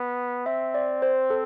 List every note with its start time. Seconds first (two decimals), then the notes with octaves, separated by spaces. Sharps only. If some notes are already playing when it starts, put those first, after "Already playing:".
Already playing: B3
0.46 C4 E5
0.74 D5
1.02 C5
1.30 A4